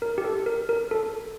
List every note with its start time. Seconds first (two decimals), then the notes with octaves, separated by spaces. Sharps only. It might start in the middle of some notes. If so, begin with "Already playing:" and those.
0.02 A#4
0.18 G4
0.24 A4
0.46 A#4
0.69 A#4
0.91 A4